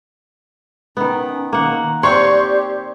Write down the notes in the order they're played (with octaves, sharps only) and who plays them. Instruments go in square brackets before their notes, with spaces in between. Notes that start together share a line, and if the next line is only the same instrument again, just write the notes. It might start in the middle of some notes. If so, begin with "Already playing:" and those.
[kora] D#3 B3 [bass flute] C#4
[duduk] D#3 [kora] A#3 F#5
[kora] C4 C#5 [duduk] G4 [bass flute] D5 [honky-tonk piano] C6 C#6